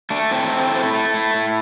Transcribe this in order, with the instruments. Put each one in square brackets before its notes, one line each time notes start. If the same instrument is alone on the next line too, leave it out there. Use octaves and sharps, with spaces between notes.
[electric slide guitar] A3 D4
A2 C4
A2
A3
A3
A2
A2